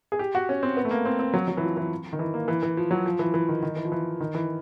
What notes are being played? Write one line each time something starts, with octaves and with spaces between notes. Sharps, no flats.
G#4
G4
F#4
C#4
C4
B3
A3
A#3
C4
C4
F#3
F#3
E3
F3
E3
D#3
E3
A#3
E3
E3
F3
F#3
F3
E3
E3
D#3
D#3
E3
F3
E3
D#3
E3